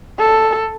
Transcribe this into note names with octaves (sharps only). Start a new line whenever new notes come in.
A4